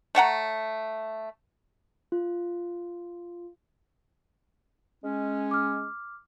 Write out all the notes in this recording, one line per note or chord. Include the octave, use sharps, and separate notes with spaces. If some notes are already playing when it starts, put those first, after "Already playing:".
A3 C#5 F#5 A#5
F4
G#3 C#4
D6 F6